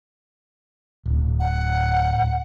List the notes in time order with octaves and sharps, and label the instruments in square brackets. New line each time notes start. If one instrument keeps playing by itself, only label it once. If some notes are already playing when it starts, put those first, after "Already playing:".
[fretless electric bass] D1
[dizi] F#5